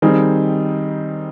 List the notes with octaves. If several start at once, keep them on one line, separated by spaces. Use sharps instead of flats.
D#3 G3 C4 D#4 G#4